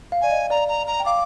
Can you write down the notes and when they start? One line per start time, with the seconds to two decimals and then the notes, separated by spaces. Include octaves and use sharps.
0.12 F5
0.21 D5 G#5
0.31 D#5
0.50 D5 A#5
0.68 A#5
0.87 A#5
1.00 G5
1.06 F5 D6